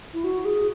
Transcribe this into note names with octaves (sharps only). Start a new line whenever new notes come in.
E4
F#4
G#4